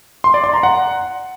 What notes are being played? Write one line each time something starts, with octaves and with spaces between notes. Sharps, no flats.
C6
D5
C6
A#5
F#5